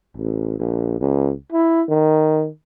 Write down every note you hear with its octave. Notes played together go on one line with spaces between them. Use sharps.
A1
A#1
C#2
E4
D#3